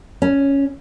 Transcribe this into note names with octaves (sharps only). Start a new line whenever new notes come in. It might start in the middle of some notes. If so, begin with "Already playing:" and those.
C#4